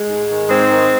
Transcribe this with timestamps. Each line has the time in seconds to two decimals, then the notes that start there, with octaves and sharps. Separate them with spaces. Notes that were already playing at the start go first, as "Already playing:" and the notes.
Already playing: G#3
0.09 G#2
0.30 D#3
0.49 G#2 G#3 C4
0.70 D#3